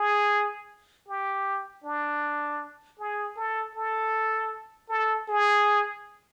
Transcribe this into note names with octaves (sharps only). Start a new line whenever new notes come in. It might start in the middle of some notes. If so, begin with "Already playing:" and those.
Already playing: G#4
G4
D4
G#4
A4
A4
A4
G#4